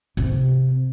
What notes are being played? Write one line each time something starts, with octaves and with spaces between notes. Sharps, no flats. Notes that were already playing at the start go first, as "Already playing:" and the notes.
C3